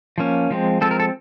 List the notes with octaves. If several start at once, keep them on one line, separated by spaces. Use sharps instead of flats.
F3 A#3 C#4
F3 G#3 C4
F3 G#3 C4 A4
A#4
A4